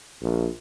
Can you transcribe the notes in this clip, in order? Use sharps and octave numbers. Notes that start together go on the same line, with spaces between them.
A#1